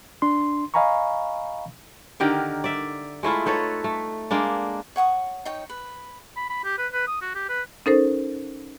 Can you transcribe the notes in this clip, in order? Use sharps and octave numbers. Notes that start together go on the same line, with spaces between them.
D4 C6
D#5 F5 G#5 A#5 B5 C#6
D3 D#3 G4 A#4
D5 E5
G#3 A3 E4 F4
D#4 A4 B4 C#5
A3
G#3 A#3 D4
C#5 F#5 C#6 D#6
D#4 C#5 G5
B4
B5
B5
G4
B4
B4
D#6
F#4
G4
B4
C#4 D#4 A4 A#4 C5